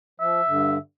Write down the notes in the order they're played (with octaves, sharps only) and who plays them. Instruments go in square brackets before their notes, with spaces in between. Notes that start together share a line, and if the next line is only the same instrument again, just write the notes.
[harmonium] F3 [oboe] E5
[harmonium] G2 D3